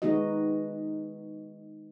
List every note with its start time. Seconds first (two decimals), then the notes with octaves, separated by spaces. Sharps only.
0.02 D#3 G#3 B3 D#4 F#4 D#5